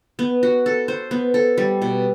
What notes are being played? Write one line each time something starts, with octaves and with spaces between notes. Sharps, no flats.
B3
F#4
A4
C5
B3
A4
G3
B2